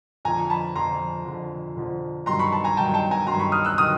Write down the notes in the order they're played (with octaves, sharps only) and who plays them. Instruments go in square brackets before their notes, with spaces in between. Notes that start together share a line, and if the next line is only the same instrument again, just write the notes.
[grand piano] F2 D3 F3 G#5 A#5
A5 B5
F2 D3 F3 A#5 C6
F2 D3 F3
F2 D3 F3
G2 D#3 F#3 A#5 C6
B5 C#6
A5 B5
G#5 A#5
G2 D#3 F#3 G5 A5
G5 A5
G#5 A#5
G2 D#3 F#3 A#5 C6
B5 C#6
D#6 F6
E6 F#6
D#3 F#3 D#6 F6